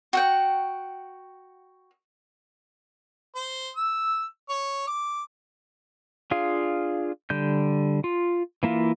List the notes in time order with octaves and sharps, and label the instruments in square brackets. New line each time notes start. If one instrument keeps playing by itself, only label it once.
[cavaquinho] F#4 F#5 G5
[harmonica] C5
E6
C#5
D6
[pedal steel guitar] D4 F4 G#4 F5
D3 G3 G6
F4
E3 A#3 E4 F4